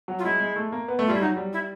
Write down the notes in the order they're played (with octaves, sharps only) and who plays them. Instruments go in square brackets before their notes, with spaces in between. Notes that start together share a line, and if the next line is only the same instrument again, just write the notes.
[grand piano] F#3
[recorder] F4
[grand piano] G#3 [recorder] E4
[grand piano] G#3
A3
A#3
B3
A3
[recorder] F4
[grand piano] G3 [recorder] E4
[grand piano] F#3 [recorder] D#4
[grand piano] G3
[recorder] E4